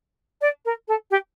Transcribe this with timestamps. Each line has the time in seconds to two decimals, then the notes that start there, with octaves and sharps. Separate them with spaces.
0.42 D5
0.66 A#4
0.88 A4
1.11 G4